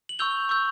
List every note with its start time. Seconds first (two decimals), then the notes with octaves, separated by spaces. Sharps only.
0.09 F#7
0.19 C#6 E6 G6 F7 G7
0.49 C#6 E6 G6